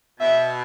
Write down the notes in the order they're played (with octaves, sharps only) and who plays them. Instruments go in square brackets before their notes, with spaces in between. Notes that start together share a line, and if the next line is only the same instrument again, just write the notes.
[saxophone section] B2 [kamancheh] E5